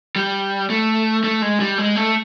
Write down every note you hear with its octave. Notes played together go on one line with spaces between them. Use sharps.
G3
A3
A3
G#3
G3
G#3
A3